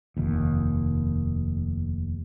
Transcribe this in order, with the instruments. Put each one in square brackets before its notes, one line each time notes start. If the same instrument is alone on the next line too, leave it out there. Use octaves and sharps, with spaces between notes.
[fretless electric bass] F1 D#2